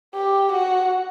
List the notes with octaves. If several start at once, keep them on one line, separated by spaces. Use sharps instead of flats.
G4
F#4